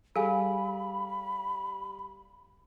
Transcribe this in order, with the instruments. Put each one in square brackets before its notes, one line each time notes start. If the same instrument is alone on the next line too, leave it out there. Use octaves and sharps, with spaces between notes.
[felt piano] G3 [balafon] G#4 [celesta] A4 F5 G#5 [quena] B5